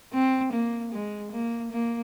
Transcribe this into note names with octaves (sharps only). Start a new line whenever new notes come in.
C4
A#3
G#3
A#3
A#3